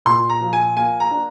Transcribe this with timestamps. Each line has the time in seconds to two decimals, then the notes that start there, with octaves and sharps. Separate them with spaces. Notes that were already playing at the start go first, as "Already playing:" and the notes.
0.05 A#2 C6
0.29 A#5
0.41 F3
0.53 G#5
0.77 A#3 G#5
1.00 A#5
1.11 D4